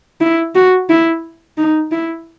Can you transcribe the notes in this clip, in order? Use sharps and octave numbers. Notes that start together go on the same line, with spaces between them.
E4
F#4
E4
D#4
E4